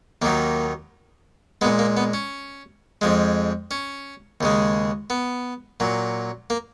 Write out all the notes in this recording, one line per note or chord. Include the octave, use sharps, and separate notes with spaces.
D#2 D#3 F#3 A#3
A#2 G#3 B3
A#3
B3
C#4
F2 F3 G#3
C#4
D#2 C#3 G#3
B3
A#2 F#3
A#3